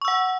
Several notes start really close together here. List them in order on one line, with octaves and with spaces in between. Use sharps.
C#6 E6 F#5